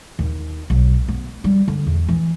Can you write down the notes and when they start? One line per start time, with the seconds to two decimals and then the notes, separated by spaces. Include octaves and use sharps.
0.19 D#2
0.70 B1
1.08 B3
1.44 G3
1.68 D3
1.86 E2
2.08 E3